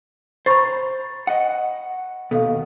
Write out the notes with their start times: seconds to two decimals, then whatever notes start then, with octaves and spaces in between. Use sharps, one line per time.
0.46 C5 A#5 B5 C#6 A6
1.27 D#5 F#5
2.31 D#2 B2 A4 F5